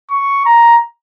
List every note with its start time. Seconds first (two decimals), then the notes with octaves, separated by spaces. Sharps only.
0.11 C#6
0.46 A#5